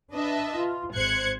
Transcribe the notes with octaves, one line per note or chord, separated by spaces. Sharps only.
D4 B4 D#5 E5 A5
F4
G#1 C5 F#6 G#6 C#7